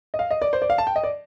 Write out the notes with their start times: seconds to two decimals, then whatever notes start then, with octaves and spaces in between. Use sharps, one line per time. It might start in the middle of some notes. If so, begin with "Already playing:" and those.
0.14 D#5
0.19 F5
0.31 D#5
0.42 D5
0.53 C5
0.62 D5
0.70 F5
0.78 A5
0.87 G5
0.96 D#5
1.04 D5